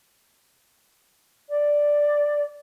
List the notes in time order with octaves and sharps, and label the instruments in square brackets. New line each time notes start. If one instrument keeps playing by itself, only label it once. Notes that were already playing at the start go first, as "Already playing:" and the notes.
[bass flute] D5